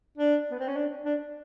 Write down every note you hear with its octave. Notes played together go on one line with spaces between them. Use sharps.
D4
B3
C4
C#4
D4
D4